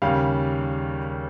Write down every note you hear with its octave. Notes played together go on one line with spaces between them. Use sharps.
D#2 C#3 G3 F5